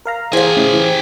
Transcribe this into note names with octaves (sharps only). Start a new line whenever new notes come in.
A#4 F5 A#5
E3 G4 G#4 C5 F5 G#5
A2 C#3 E4
E3